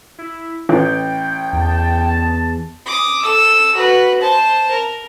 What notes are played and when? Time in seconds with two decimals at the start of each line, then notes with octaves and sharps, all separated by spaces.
0.18 E4
0.69 A1 G5
1.53 E2 A5
2.86 D6 D#6
3.22 A4 E6
3.75 F#4 B4
4.21 C5 A5
4.70 A#4